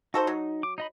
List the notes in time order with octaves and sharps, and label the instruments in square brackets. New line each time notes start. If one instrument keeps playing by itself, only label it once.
[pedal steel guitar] D#4 [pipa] F#4 A4 C5
[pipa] F#3
[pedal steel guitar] D6
D#4 D#5 B5